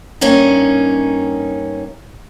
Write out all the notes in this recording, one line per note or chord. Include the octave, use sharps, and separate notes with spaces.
G2 A#3 C#4 D#4